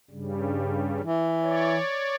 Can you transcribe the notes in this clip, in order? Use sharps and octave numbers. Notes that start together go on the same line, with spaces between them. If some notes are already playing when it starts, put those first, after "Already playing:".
G2 C#3 G3
E3
C#5 D5